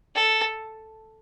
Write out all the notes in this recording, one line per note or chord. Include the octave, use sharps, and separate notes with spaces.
A4